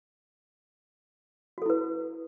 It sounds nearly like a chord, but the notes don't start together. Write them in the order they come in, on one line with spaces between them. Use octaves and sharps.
F#4 A4 E4 B4